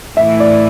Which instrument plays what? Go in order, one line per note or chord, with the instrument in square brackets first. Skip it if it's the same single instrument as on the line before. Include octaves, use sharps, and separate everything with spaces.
[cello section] A2 E3 A3 E4 [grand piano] E5
[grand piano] D5